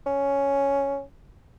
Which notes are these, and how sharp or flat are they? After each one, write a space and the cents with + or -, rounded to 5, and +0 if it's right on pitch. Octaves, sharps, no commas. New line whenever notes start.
C#4 +5